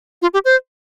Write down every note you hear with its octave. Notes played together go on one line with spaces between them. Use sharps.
F4
G4
C5